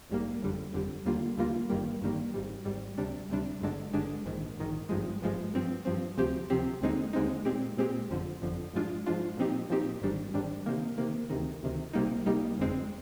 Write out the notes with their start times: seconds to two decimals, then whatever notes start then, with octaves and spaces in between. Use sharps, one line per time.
0.10 A#1 G#2 G3 A#3
0.42 G1 F2 D3 G3
0.73 G1 F2 D3 G3
1.05 D#2 D3 G3 A#3 F4
1.37 D#2 D3 G3 A#3 F4
1.70 G#1 G2 D#3 G3 A#3
2.01 G#1 G2 D#3 G3 A#3
2.34 G#1 G#2 G3
2.65 G#1 G#2 G3
2.98 D2 C3 G3 D4
3.29 D2 C3 G3 D4
3.61 G#1 G2 D3 G#3 D4
3.93 G#1 G2 D3 G#3 D4
4.25 A#1 G#2 D#3
4.57 A#1 G#2 D#3
4.89 G#1 G2 F3 G#3
5.22 G#1 G2 F3 G#3
5.54 G2 F3 C4
5.85 G2 F3 C4
6.17 D2 C3 F3 C4 G4
6.50 D2 C3 F3 C4 G4
6.82 D#2 D3 G#3 C4 D#4
7.13 D#2 D3 G#3 C4 D#4
7.45 A#2 G#3 C4 G4
7.77 A#2 G#3 C4 G4
8.09 G1 F2 D3 F3
8.42 G1 F2 D3 F3
8.74 G#2 F3 G#3 D4 F4
9.06 G#2 F3 G#3 D4 F4
9.37 A#2 F3 C4 D#4 G4
9.70 A#2 F3 C4 D#4 G4
10.02 G#1 G#2 D#3 G3 D4
10.34 G#1 G#2 D#3 G3 D4
10.66 C3 D#3 A#3
10.98 C3 D#3 A#3
11.30 D2 C3 D#3
11.62 D2 C3 D#3
11.93 C2 C3 G3 A#3 D#4
12.26 C2 C3 G3 A#3 D#4
12.58 G1 F2 D3 G#3 C4